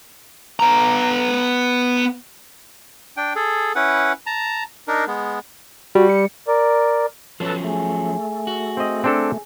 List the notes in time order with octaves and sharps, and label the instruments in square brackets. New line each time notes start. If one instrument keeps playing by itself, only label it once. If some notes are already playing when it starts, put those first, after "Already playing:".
[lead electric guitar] B3 A#5
[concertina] D4 G5
G#4 A4
C#4 E4 B4 F#5
A5 A#5
D4 D#4 A#4
G#3 B3
[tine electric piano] G3 [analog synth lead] F#4
[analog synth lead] C#7
[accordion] A#4 D5
[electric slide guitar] F3 F#3 C#4 [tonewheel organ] A4 B4 A5
[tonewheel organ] A3 [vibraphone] G#4 G#5
[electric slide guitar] F#4
[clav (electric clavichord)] C4 D#5
C4 D4 A4